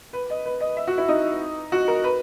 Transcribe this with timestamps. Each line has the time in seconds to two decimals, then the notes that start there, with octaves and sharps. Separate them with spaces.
0.13 B4
0.30 D#5
0.45 B4
0.61 D#5
0.77 E5
0.87 F#4
0.98 E4
1.08 D#4
1.72 F#4
1.88 A#4
2.04 B4